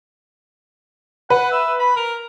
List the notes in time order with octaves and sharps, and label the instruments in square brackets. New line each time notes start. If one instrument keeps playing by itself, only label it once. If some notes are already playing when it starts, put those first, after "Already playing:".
[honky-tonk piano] B4 [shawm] F#5
[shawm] E5
B5
A#4